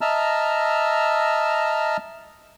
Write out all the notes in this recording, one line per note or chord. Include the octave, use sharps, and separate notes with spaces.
D#5 E5 A5 A#5 E6 F6